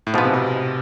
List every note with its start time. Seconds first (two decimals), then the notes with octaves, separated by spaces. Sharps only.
0.07 A2
0.14 G#2 B2 F3 B3
0.24 C3
0.34 B2